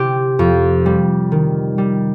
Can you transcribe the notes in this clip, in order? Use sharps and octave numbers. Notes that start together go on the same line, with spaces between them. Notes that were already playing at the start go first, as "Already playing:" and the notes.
Already playing: C3 G4
F2
G3
D#3
G3